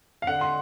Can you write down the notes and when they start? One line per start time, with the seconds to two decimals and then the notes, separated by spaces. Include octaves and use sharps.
0.22 F5
0.27 D3 F#5
0.41 C6